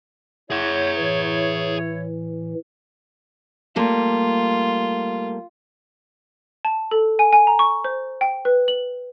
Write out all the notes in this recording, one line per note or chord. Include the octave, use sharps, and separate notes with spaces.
E4 G#4 C#5 F#5
A2 E3
G3 A3 A#3 F4
A5
A4
G#5
G#5
A#5
C#6
C5
G5
B4
F#7